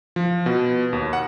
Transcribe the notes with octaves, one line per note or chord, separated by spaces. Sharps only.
F3
B2
D#2
F#5